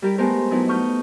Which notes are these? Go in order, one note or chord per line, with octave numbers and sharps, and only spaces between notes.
G3 E4 G4 A#4
G#3 A3 B3 G4 A#4 C5
F#3 A3 B3 D#4 E4
A3 D#4 C#6 D#6 F6 G6